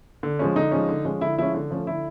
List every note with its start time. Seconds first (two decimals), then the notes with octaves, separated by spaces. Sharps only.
0.23 D3
0.39 F3 G#3 C#4
0.56 D3 D#4
0.71 F3 G#3 C#4
0.88 D3
1.05 F3 G#3 C#4
1.21 D3 E4
1.38 F3 G#3 C#4 E4
1.54 D3
1.71 F3 A3 C#4
1.87 D3 E4